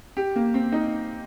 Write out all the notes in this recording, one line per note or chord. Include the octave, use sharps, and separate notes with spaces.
G4
A#3
C4
D#4